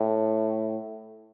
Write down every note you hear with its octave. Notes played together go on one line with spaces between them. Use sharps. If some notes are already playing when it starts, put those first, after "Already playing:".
Already playing: A2